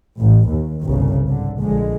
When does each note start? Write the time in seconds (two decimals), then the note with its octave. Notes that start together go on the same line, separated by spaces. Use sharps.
0.18 A1
0.49 D#2
0.84 G1 C2 C#3
1.28 G#2 D3
1.60 A#1 D3 G#3